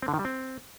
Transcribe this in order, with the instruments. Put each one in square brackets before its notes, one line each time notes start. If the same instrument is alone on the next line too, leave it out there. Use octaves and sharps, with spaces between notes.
[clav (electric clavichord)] C4
D3
D#3
G3
C4